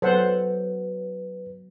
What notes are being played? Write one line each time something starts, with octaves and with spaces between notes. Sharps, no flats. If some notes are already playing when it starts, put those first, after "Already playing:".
F#3 B3 A4 B4 C5 F#5